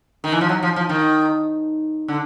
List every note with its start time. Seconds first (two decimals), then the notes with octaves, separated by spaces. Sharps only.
0.24 D#3
0.32 E3
0.41 F3
0.49 F#3
0.63 F3
0.76 F3
0.89 D#3
2.08 D3